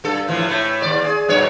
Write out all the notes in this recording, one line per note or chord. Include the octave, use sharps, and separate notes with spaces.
G2 A4
A2 E3 F3
A2 A3
D#2 D5
G#4
G2 B2 C#5